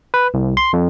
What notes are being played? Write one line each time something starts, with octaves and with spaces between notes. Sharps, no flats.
B4
C2
C6
F2